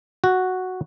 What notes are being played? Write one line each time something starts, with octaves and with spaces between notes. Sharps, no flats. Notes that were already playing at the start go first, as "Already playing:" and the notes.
F#4